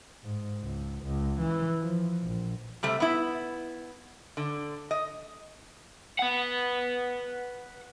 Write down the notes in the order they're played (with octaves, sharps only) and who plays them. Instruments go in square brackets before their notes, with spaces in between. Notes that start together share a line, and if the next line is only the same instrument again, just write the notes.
[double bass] G#2
C#2
C#2
E3
F3
A#1
[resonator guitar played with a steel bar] C3 G3 A3
B3 E4
D3
D#5
[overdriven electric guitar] B4 F#5